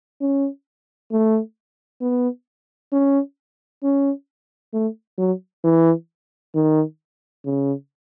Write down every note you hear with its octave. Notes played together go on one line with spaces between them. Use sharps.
C#4
A3
B3
C#4
C#4
A3
F#3
E3
D#3
C#3